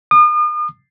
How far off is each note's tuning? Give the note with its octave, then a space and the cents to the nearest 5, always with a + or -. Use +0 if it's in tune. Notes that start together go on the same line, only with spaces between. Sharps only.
D#6 -40